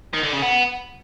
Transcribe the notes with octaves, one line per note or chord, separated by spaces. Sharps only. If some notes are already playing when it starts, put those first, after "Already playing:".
D#3
D3
C#3
B3